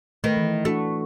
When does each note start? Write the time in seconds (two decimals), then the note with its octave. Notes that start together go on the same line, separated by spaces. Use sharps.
0.24 D#3 A3 B4
0.37 E3
0.65 A3 D4 F#4